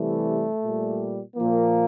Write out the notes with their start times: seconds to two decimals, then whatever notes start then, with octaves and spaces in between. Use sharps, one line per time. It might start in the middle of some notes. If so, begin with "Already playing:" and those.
Already playing: C3 E3 G3 A3
0.63 A#2 G3
1.36 A#2 F3 A#3